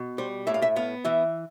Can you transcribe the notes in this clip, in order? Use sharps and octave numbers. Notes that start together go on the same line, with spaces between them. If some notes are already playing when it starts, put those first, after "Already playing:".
Already playing: B2
G3 C5
A2 E5
F5
E5
B3 F5
E3 E5